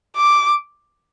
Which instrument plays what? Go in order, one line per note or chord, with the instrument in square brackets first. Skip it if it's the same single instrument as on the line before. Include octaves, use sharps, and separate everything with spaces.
[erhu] D6